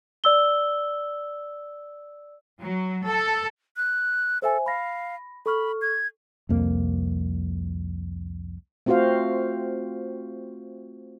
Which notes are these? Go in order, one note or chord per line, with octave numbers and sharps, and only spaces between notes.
D5 E6 G7
F#3
A4
F#6
A4 C5 E5 G#5
F5 B5 A#6
A4 B5 C#6 F6
G#6
C2 F2 A#3
A3 C4 F4 F#4 C5 F5